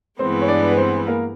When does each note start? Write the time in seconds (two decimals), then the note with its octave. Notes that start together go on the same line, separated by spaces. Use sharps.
0.19 G2 E3 G#3 B3 C4 C5
0.42 C#5
0.48 D4 D5
0.71 B4
0.78 C4 C5
1.07 A#3 A#4